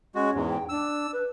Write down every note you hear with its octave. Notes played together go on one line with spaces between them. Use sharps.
G#3 C#4 F#4
E2 G#2
G5
D4 E6
B4